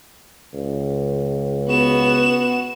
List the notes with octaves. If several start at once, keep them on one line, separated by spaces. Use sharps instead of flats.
C#2
B3 F#4 E7